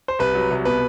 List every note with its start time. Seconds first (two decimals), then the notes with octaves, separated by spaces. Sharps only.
0.08 C5
0.19 C2 B4
0.35 F#3
0.51 C2
0.65 B2 B4